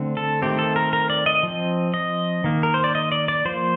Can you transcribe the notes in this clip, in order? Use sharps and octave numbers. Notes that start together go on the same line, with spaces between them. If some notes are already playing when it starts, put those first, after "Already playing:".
Already playing: D3 A3 C4
A4
D#3 A3 C4 G4
A4
A#4
A#4
D5
D#5
F3 C4
D#5
D#3 A#3
A#4
C5
D5
D#5
D5
D5
F3 A#3 C5